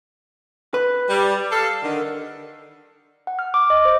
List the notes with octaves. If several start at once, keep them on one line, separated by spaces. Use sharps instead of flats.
B4
G3
A4 F5
D3 D#3
F#5
F6
D6
D#5
C5